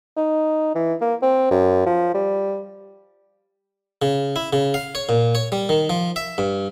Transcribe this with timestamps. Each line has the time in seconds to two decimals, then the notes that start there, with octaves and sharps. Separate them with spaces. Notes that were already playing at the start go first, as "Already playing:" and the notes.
0.17 D#4
0.75 E3
1.01 A#3
1.22 C4
1.51 F#2
1.86 F3
2.14 G3
4.02 C#3
4.36 E4
4.53 C#3
4.74 F5
4.95 C#5
5.09 A#2
5.35 C#5
5.52 G3
5.69 D#3
5.90 F3
6.16 E5
6.38 G2